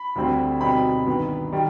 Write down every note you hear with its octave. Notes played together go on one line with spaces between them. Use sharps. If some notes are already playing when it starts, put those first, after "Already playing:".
Already playing: B5
D2 D3 G3 C4
B2 G3 C4 D#4 B5
G2 D#3 B3
D#3 G3